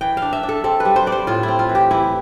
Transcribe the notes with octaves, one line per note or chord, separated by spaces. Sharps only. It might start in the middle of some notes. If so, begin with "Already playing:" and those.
E3 G5
D4 F5
E5
D4
A4
C4 A4
B4
G3
C5
G3 D5
C5
A2 F4
E4
C4
F4
E3
G4
E3 E4